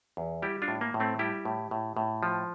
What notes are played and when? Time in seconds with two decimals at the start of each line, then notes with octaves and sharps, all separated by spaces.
0.17 E2
0.42 G3 E4 G4
0.62 D4 F4
0.68 A2
0.81 A#3
0.94 A2
1.00 A3 C4
1.19 G3 E4 G4
1.45 A2
1.71 A2
1.97 A2
2.23 F3